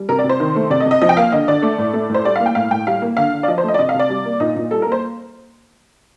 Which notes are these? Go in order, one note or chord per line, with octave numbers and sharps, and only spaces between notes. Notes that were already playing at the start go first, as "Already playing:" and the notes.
Already playing: G3
C3 A#4
D5
C3
C5
D#3
A3
C3 D5
D#5
C3
D#5
F3 D#5
G5
A#3 F5
D3 D#5
D3 D5
A3
A2
A3
A2 C5
G3 D5
F5
A#3
G5
A2 F5
A2 G5
G3 F5
A#3
D3 F5
D3
D5
F3 D#5
C5
A3 D#5
D5
C3 D#5
F5
C3
D5
G3
A#3
A#2 D#4
A#2 D#4
G3 A4
A#4
A#3
C5